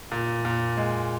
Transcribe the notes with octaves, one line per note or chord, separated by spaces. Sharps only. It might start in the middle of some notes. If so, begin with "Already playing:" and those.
A#2
A#2
G#3